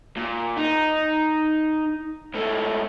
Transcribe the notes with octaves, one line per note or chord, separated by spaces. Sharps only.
A#2
D#4
G#2 A3